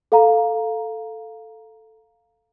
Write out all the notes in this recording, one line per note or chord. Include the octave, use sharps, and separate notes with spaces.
A4 F5 A#5